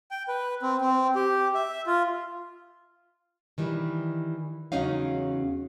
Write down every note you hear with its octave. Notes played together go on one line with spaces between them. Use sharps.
G5
B4
C4
C4
G4
E5
F4
D#3 E3 G3
E2 C#3 F#3 C#4 D#4 F5